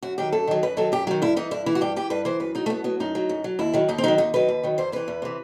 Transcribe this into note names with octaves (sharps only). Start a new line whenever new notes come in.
F#2 F#4
D#3 F#3 G4
F#2 A4
D#3 F#3
F#2 B4
D#3 F#3 A4
F#2 G4
D#3 F#3 F#4
G2 E4
E3 D#4
G2 E4
E3 E4
F#4
G2 G4
E3 G4
G2 B4
E3 C5
F#2 B4
F#3 D#4
A3
F#2 B3
F#3 B3
F#2 D#4
F#3
F#2
F#3
D#2 E4
D#3 F#3
D#2 D#4
C4
D#3 F#3 D#4
D#2 D#4
D#3 F#3 B4
D#2
D#3 F#3
E2 C5
C3 E3 B4
E2
C3 E3